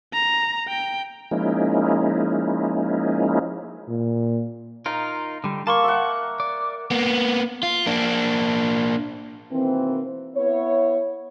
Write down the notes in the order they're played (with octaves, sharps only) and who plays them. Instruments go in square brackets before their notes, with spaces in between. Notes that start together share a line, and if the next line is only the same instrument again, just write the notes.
[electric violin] A#5
G5
[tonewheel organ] F3 G#3 A#3 C#4 D#4 E4
[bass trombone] A#2
[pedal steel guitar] D#4 F4 A#4 [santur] A#5
[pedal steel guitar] D3 G3
[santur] A#3 [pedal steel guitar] A5 C6 C#6
[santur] E5 F#5
[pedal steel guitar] D5
[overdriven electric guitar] A#3 B3
F4
A#3 D4
[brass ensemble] B2 D#3 E3 A#3 C4
B3 E4 C#5